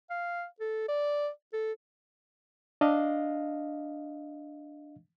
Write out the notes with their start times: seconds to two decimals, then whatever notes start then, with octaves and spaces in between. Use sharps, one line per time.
0.10 F5
0.60 A4
0.89 D5
1.53 A4
2.81 D4 D#5 F5